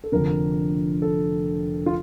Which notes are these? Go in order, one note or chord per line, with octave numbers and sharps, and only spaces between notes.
A4
F1 F2 D3 A#4
A4
F4